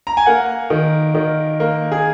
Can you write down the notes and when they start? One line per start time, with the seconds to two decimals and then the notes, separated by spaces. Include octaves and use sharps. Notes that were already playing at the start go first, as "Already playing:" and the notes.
0.07 A#5
0.17 G#5
0.26 A#3 F#5
0.70 D#3
1.15 D#3
1.60 A#3
1.92 G#4